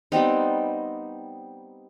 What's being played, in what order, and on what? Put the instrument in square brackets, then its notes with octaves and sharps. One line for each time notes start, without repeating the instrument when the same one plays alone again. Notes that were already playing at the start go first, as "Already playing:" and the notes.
[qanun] G3 B3 C4 D#4